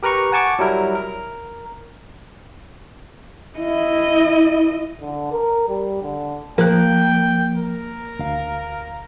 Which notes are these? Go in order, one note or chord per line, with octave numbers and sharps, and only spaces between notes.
G4 A#4 B4 A#5 C#6
F#5 G#5 A5 C#6 D6
F#3 G3 E4 A#4
A#4
E4 D#5
D3
A#4
G3
D3
F3 A#3 G5 F#6
A#4
D2 F5